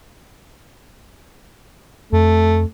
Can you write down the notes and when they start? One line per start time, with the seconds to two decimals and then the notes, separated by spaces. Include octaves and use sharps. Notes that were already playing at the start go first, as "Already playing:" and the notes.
2.13 F2 A3